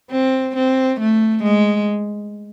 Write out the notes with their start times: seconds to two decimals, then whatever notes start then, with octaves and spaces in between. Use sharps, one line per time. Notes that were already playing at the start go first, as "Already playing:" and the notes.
0.11 C4
0.56 C4
1.00 A3
1.43 G#3